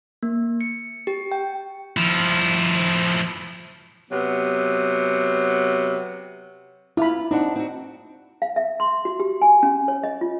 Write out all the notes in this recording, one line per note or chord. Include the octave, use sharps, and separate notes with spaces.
A#3
C#7
G4
G5
F3 E4
C3 F#3 B3
E4 F4 B5
C4 D4 D#4 F#5
C4 F#4
F5
E5
C6
F#4
G4
G#5
C#4
C#5
D#5
F4